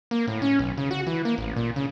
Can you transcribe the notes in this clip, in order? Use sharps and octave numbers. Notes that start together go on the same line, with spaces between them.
A#3
A2
C#4
B1
C#3
F#4
E3
A#3
A1
A#2
C#3